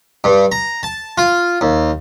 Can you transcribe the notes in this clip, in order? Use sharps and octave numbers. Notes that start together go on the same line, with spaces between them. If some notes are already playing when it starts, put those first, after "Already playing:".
G2
A#5
A5
F4
D#2